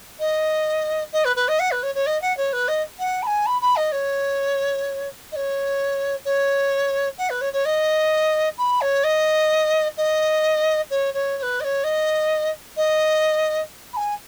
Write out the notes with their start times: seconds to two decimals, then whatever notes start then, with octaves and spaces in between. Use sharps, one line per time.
0.19 D#5
1.13 D#5
1.25 B4
1.36 B4
1.48 D#5
1.59 F#5
1.71 B4
1.83 C#5
1.95 C#5
2.06 D#5
2.22 F#5
2.37 C#5
2.53 B4
2.68 D#5
2.99 F#5
3.23 B5
3.27 G#5
3.46 B5
3.61 B5
3.76 D#5
3.92 C#5
5.32 D#5
5.36 C#5
6.25 C#5
7.18 F#5
7.30 B4
7.41 C#5
7.53 C#5
7.65 D#5
8.58 B5
8.81 C#5
9.04 D#5
9.97 D#5
10.90 C#5
11.14 C#5
11.37 C#5
11.42 B4
11.60 D#5
11.64 C#5
11.84 D#5
12.77 D#5
13.93 B5
13.97 G#5